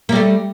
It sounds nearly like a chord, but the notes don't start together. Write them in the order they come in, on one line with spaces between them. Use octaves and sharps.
A#3 G3 A3